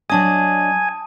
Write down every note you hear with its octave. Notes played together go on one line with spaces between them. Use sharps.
F#3 D4 D#5 G#5 A5 D#6